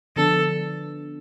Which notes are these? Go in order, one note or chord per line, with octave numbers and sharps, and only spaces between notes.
D3 F3 B3 D4 A4